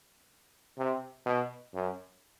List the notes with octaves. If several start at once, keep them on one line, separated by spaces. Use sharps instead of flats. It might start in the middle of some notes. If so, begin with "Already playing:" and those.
C3
B2
F#2